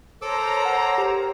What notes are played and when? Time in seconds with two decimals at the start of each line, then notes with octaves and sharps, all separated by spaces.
0.22 A4 A#4 C5 C#5 A#5 D6 E6
0.65 F#5
0.98 G4